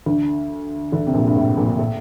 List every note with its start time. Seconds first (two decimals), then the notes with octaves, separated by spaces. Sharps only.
0.06 D2 D3
0.92 D2 D3
1.07 C3
1.14 A#1 A#2
1.27 G2
1.36 A2
1.57 A#1 A#2
1.79 A2